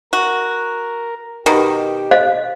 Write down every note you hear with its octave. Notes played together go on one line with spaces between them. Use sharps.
F#4 A#4
B2 D#3 G4
C5 D#5 F5